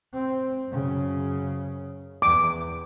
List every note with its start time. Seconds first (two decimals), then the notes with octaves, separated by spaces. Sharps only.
0.14 C4
0.68 F#2 C#3
2.22 E2 D6